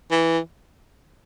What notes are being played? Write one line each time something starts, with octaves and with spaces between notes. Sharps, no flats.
E3